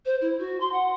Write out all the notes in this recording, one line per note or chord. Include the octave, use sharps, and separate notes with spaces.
C5
E4
F#4
C6
F#5